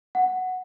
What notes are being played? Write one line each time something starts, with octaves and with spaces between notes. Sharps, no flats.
F#5